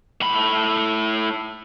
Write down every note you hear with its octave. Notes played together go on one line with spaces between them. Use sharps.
A2 B5